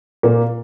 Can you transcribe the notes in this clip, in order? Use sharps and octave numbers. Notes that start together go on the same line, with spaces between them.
A#2 A#3